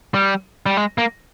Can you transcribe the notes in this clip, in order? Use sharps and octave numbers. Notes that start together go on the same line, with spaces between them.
G3
G3
G#3
A#3